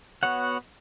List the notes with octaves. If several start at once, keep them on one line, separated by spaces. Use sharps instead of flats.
B3 F#4 C#5 F#5